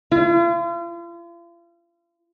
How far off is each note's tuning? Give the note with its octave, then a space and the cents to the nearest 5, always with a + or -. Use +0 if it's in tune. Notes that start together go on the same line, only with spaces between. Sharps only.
F4 -40